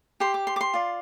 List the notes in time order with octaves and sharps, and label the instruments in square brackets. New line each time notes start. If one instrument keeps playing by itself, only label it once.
[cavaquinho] G4 C5 C6
D6
C6
D6
C6
F4 D5